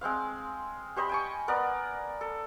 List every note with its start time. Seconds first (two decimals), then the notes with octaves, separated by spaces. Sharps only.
0.01 G#3 C4 C5 F5
0.96 G4 C5 D#5 B5
1.09 G5 G#5 C#6
1.48 B3 A#4 D5
2.21 A4